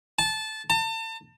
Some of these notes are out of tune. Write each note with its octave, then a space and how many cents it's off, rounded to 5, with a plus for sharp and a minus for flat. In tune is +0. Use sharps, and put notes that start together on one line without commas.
A5 -15
A5 +35